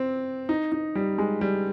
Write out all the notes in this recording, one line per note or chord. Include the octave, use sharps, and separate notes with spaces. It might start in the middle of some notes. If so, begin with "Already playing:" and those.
Already playing: C4
D#4
D#4
G3
G#3
G3